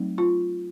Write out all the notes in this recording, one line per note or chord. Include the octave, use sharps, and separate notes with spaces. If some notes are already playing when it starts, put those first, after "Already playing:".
Already playing: F#3 A3 C4 D#4
F4